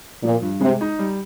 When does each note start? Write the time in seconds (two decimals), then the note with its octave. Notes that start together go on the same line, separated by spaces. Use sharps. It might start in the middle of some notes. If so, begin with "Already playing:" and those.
0.23 A#2 F3
0.42 G2
0.61 C3 G#3
0.81 D#4
0.99 G3